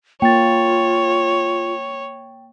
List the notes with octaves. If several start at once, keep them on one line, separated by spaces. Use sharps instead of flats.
A#3 F4 C#5 G5 A6